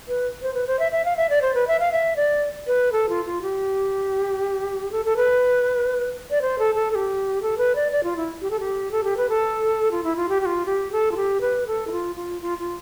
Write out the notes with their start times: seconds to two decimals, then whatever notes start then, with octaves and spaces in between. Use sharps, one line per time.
0.08 B4
0.42 C5
0.54 B4
0.67 C5
0.79 E5
0.92 E5
1.05 F5
1.17 E5
1.30 D5
1.42 C5
1.54 B4
1.68 E5
1.80 F5
1.92 E5
2.16 D5
2.67 B4
2.92 A4
3.09 F4
3.25 F4
3.42 G4
4.92 A4
5.05 A4
5.17 B4
6.31 D5
6.42 C5
6.59 A4
6.75 A4
6.91 A4
6.95 G4
7.42 A4
7.58 B4
7.76 D5
7.92 D5
8.04 F4
8.17 E4
8.41 G4
8.51 A4
8.60 G4
8.91 A4
9.04 G4
9.17 B4
9.29 A4
9.91 F4
10.04 E4
10.16 F4
10.29 G4
10.41 G4
10.46 F4
10.66 G4
10.92 A4
11.12 F4
11.17 G4
11.41 B4
11.67 A4
11.87 E4
11.92 F4
12.16 F4
12.42 F4
12.58 F4